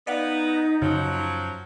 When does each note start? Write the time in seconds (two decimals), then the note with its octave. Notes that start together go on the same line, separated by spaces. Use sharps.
0.07 B3 D#4 D5 F5 F#5
0.82 F#2 C#3 F3 F#3